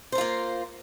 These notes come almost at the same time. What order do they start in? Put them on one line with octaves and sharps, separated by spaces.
C5 A#4 F4 A#3